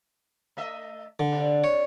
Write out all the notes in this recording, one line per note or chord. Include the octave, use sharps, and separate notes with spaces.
A3 D#5 E5
D3
C3 D4
C#5